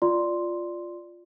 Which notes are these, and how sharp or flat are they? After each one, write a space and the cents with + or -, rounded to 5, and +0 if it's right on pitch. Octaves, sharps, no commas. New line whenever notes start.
F4 +0 D5 +0 C6 +0